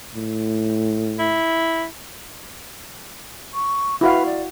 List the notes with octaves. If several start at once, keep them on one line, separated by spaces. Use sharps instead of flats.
A2
E4
C#6
E4 F#4 B4 F5
D5